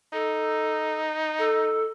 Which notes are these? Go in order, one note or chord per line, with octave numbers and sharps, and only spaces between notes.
D#4 A4
A4